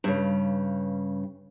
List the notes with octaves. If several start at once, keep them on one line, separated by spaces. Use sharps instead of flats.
G2 C#3